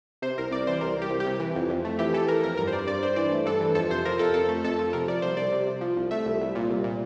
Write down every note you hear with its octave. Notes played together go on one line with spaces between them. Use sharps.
C3 C5
C2 A#4
C2 D5
E3 C5
C2 A#4
C2
G4
C2
G4
C3
E3
F2
F2
A3
E3 G4
E3 A4
E3 A#4
F2 A#4
G2 A#4
C5
G2 D5
G2 D5
G2 C5
E3 D5
A3
G2 A4
E3
F2 A4
C3 C5
F3 A#4
F2 A4
F2 A4
A3
F2 A4
F3
C3 A#4
F3 D5
C2 C5
C2 D5
C3
C3
F3
C2
A3 E5
C2
C2
A#2
C2
A#2